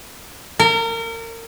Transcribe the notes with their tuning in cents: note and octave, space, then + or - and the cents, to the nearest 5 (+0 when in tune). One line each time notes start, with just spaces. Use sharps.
A#4 -30